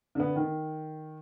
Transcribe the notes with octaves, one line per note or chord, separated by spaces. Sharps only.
D3 B3
D#3